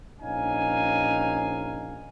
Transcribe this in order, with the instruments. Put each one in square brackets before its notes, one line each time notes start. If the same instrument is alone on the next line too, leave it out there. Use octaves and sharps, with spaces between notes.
[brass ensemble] A#1 C#4 D#4 F5 G#5